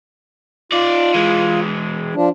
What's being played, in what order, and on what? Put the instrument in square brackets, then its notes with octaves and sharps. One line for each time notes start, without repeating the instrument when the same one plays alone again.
[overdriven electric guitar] D#4 D5 [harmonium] F4
[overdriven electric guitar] E3 G#3
[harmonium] F3 D4